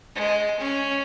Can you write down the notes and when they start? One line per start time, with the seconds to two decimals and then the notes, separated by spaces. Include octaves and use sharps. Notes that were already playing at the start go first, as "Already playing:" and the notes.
0.15 G#3
0.60 C#4